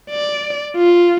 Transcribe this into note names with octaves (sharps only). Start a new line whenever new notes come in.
D5
F4